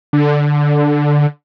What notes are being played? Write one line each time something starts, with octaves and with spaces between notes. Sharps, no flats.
D3